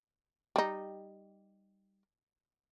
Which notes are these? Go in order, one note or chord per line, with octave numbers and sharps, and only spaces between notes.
G3 D#4